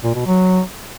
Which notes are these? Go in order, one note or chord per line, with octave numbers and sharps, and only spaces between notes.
A#2
B2
F#3